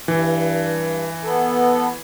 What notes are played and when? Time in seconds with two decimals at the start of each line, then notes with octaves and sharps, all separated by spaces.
0.08 G2 E3
1.24 B3 A4